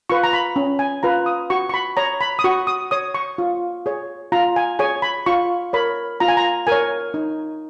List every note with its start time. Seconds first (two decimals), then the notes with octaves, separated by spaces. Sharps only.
0.10 F4 B4 C#6
0.24 A#5
0.33 B5
0.56 C#4
0.79 G#5
1.03 F4 B4 A#5
1.26 D#6
1.50 F#4 C#6
1.69 C#6
1.74 B5
1.97 C#5 A#5
2.21 B5
2.39 D#6
2.44 F#4 C#6
2.67 D#6
2.91 C#5 D#6
3.15 C#6
3.38 F4
3.86 G#4 C#5
4.32 F4 A#5
4.56 G#5
4.79 G#4 C#5 G#5
5.02 B5
5.26 F4 C#6
5.73 A#4 C#5 B5
6.20 F4 A#5
6.28 G#5
6.37 A#5
6.67 A#4 C#5 G#5
7.14 D#4